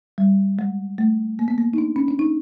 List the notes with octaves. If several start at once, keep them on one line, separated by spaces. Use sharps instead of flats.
G3
G#3
A3
A#3
B3
A#3
D#4
D4
C#4
D4
D#4